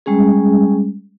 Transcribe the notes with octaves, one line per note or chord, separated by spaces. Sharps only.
G3 G#3 C#4 G#4